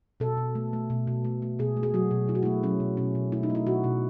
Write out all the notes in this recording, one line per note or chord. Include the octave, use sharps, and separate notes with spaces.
B2 A4
B2
A3
A3
B2
B2
A3
A3
B2 G#4
A3
G#4
F#3 F#4
B2
B2 E4
F#4
A3 E4
F#3 C#4
B2
B2 C#4
B2
A3 E4
D#4
A3
E4
B2 F#4
B2